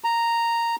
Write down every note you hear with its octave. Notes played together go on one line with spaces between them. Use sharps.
A#5